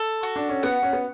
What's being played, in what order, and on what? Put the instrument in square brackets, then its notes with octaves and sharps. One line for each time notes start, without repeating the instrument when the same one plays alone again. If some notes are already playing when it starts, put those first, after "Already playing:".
Already playing: [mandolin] A4
F#4
[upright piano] D4
C#4
[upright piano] B3 [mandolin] F#5
[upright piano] C#4
B3